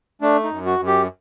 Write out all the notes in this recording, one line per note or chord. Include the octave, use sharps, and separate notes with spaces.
A3 D4
D#4
F#2
F#4
F#2
G4